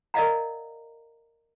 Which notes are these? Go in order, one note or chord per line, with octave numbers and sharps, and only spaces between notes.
A#4 D5 D#5 F5 F#5 A#5